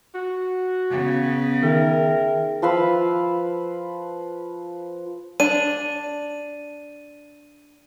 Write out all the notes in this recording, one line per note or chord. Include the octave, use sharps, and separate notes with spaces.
F#4
C#3 B3
D#3 G#4 A#4 E5 G5
F3 B4 F5 E6
D4 D#7